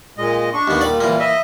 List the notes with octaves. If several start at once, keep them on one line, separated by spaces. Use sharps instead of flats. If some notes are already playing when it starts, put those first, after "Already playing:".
A#2 G#3 D#5
D4 C#6
D#2 B3
A#2 G3 D5 B5
E3 A#3
D#5 E5